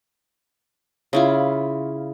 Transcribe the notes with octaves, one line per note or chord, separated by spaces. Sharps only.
C#3 E4 F4